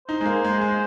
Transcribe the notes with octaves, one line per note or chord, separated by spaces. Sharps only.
D#4 C5
G#3
A#3
G#3
G#3